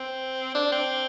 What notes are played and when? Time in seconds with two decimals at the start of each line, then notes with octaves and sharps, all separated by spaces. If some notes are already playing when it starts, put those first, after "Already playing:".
Already playing: C4
0.55 D4
0.72 C4